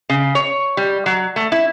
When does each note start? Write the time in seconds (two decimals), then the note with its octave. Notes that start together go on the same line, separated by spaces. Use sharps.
0.09 C#3
0.35 C#5
0.77 G3
1.06 F#3
1.36 A3
1.52 E4